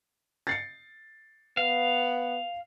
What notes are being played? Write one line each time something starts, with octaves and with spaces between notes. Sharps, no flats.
A6 C7 C#7
B3 F5